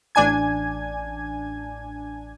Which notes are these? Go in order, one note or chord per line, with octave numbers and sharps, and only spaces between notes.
A1 D4 G#5 G#6